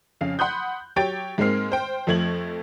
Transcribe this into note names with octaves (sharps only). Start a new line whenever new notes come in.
F2 C#3 F5
F#5 B5 C6 D#6 F#6 G6
F#3 G4 C#5 G5 A6 D7
G#2 G#3 A#3 C4 F6 C7
C5 G5
F2 F3 A3 G#6 F#7